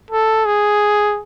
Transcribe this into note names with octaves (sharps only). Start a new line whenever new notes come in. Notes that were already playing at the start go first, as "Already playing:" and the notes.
A4
G#4